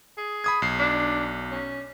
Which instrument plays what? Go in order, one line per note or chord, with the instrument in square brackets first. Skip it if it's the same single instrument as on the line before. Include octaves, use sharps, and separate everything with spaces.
[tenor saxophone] G#4
[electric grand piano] B5 D#6 G#6
B1 C7
[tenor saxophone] D4
C#4